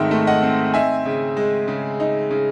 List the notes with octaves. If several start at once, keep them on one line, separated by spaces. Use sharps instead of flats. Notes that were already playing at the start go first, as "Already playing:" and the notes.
Already playing: G#2 D#3 A3 C4 D#5 E5
A3
D#5 F#5
C4
D#4 E5 G#5
C#3
G#3
C#3
D#4
C#3